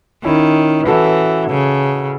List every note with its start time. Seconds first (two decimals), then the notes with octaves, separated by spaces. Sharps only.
0.24 D#3 C#4 E4
0.83 B4
0.87 E3 F#4 A4
1.50 C#3